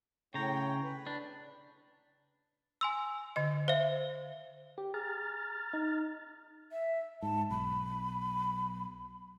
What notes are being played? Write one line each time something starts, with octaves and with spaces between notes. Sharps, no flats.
A2 C#3 C#5 G5 A#5
B4
D4
G#5 C6 E6
D3 D#5
C5 E5 F5
G4
G#4 A#5 F6 A6
D#4
E5
G#2 A5
B1 B5